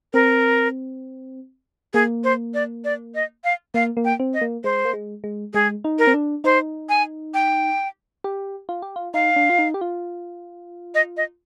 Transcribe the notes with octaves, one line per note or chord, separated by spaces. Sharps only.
C4 A#4
A#3 G#4
C5
D5
D5
D#5
F5
A#3 F5
A#3
G5
C4
D#5
A#3
G#3 C5
A#3
G#3
G#3
G#3 G#4
D#4
A#4
C4
D4
D#4 C5
G#5
G5
G4
F4
G4
F4
D#4 F5
D4
F4
D#4
G4
F4
D#5
D#5